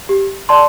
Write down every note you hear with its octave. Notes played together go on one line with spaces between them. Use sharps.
G4
D5 A5 C6